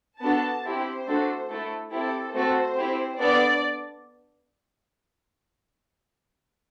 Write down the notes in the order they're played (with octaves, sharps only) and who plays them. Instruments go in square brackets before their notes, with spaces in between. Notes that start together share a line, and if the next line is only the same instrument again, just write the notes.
[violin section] B3 D4 F#4 A4 A5
C4 E4 G4 C5
A3 D4 F#4 A4
A3 E4 A4
C4 E4 G4 A4
A3 C4 F#4 A4 C5
C4 E4 G4
B3 D4 A4 D5